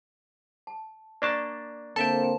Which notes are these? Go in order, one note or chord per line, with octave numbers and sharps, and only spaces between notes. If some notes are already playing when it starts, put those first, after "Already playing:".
A5
A#3 D4 D5 A5 C#6
D3 A#3 C4 A4 E5 G5 A5